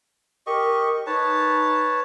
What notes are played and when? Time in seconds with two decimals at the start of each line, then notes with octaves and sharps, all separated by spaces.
0.47 G4 A#4 D#5 C#6
1.07 D#4 B4 C#5 A5